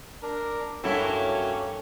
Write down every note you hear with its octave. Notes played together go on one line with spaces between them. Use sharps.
D4 A#4
G2 F#3 A#3 C#4 E4 G4 A4